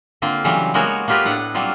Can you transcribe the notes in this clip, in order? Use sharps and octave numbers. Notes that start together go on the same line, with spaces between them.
D3 A#3 C4 F4
C#3 E3 F#3 G3 A3 C4
G#3 A#3 B3 F#4 A#4 C#5
A#3 B3 F4 G4 A#4 B4
A2 D4 A4 F#5
F#3 G3 A#3 C4 F4